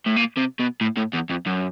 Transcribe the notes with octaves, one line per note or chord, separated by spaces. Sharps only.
A2
A#2
C3
B2
A2
A2
E2
F2
F#2